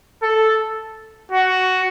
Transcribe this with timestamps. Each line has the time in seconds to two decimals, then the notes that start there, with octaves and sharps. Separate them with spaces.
0.22 A4
1.32 F#4